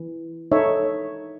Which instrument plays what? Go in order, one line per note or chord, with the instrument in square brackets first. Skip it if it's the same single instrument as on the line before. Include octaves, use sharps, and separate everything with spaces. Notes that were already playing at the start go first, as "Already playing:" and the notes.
Already playing: [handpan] E3
[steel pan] D#4 A4 C#5 E5